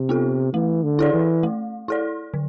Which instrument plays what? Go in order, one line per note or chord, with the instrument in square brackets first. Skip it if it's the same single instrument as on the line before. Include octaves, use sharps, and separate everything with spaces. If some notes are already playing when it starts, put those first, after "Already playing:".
Already playing: [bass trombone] C3
[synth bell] B3 F4 A4
[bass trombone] E3 [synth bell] A3
[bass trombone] D3
[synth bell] E4 A4 D5
[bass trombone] E3
[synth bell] A3
E4 A4 D5
D3